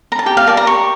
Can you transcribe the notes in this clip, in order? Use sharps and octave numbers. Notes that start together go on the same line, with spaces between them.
A#5
A5
G4 G5
F5
A#4 D5 A5
A#5
G4 C#6